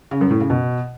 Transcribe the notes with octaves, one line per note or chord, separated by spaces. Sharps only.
C#3
F#2
A2
C#3
B2